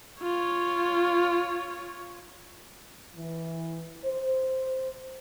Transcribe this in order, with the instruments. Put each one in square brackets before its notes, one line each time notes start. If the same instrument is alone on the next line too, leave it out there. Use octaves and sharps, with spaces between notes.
[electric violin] F4 C#5
[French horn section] E3
C5